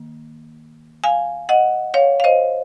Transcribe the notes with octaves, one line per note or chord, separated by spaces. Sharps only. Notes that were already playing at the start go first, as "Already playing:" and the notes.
Already playing: D#3 A#3
F5 G#5
D#5 F#5
C#5 F5
F5
C5 D#5